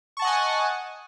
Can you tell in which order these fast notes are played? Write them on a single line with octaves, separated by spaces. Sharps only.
C#6 A5 F#5 D#5 G#5